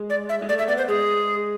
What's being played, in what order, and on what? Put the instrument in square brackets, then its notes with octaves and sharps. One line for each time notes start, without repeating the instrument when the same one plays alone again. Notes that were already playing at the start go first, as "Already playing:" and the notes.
Already playing: [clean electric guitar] G#3
[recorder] D5
E5
[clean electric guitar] G#3
[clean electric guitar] A3 [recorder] D5
[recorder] E5
[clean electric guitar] B3 [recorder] D5
[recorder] C5
[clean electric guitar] G#3 [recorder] G#4